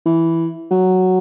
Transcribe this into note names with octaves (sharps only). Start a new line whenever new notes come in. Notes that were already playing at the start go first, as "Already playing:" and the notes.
E3
F#3